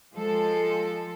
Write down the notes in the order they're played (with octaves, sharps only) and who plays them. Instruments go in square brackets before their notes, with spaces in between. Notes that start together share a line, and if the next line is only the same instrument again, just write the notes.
[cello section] F3 G#3 A4